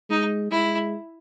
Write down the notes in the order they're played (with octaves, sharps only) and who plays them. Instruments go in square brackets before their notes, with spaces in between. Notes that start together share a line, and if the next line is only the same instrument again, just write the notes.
[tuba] G#3 [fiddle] D#4
[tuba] G#3 [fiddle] E4